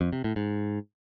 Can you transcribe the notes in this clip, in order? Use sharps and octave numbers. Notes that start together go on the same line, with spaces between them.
F2
C3
A2
G#2